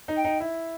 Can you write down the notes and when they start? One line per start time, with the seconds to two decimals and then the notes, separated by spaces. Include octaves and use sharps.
0.08 D#4
0.16 G5
0.25 D#4
0.40 E4